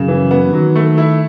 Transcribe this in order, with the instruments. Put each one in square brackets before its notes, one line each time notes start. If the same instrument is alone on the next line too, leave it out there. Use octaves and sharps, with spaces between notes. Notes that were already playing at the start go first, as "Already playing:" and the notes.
Already playing: [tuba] F#2 [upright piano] C#3
[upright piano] E3
B3
[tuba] D#3 [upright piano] F#3
[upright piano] A3
E4